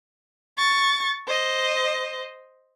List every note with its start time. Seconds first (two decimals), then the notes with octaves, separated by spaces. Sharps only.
0.57 C#6 A6
1.27 C5 D#5